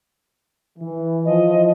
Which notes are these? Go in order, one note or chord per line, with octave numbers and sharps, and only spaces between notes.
E3
F3 D#5